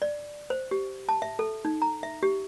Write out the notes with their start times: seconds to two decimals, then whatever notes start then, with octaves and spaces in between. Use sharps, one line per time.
0.02 D5
0.50 C5
0.71 G4
1.09 A5
1.22 E5
1.39 A4
1.65 D#4
1.82 A#5
2.03 E5
2.23 G4